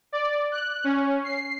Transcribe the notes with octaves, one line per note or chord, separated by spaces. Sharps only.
D5
F#6
C#4
C7